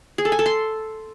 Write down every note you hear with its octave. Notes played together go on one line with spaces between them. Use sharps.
G#4
A4
G#5
A4
C6